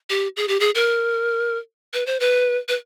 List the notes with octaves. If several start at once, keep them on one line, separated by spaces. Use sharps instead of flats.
G4
G#4
G4
G#4
A#4
B4
C5
B4
B4